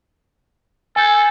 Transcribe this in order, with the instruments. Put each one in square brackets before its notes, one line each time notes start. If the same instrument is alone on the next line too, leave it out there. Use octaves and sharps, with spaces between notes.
[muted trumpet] A4 [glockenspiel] G#5 G6